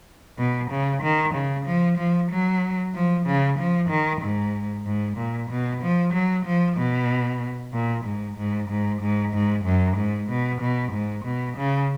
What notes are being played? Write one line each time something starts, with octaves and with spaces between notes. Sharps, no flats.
B2
C#3
D#3
C#3
F3
F3
F#3
F3
C#3
F3
D#3
G#2
G#2
A#2
B2
F3
F#3
F3
B2
A#2
G#2
G#2
G#2
G#2
G#2
F#2
G#2
B2
B2
G#2
B2
C#3